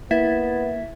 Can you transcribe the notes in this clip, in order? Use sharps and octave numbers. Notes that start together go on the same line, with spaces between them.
A#3 B3 E4 E5 G#6 A6